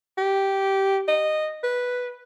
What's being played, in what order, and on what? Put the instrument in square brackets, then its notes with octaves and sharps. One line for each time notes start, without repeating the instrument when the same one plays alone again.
[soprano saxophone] G4
D#5
B4